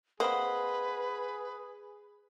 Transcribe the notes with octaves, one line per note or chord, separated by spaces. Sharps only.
A#3 C4 G#4 B4 C5 D#5 F#5